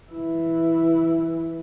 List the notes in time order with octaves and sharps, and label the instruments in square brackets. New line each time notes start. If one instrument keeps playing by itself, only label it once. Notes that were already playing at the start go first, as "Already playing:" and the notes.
[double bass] E3 E4